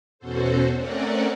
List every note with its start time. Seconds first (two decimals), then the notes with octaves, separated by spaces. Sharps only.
0.19 E2 B2 C#4 F#4 A4 C5
0.74 A3 C4 C#4 A#4 D5 F#5